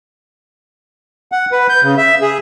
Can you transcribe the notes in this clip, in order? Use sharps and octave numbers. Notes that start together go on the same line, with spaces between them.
F#5
B4
G6
C#3
E5
G#4